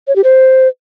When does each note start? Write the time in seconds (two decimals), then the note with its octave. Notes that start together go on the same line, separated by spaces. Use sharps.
0.08 C#5
0.16 G4
0.24 C5